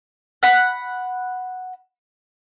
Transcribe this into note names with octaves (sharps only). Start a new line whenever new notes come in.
F#5 B5